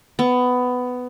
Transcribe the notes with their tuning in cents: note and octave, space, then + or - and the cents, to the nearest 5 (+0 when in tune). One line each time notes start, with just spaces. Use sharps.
B3 +15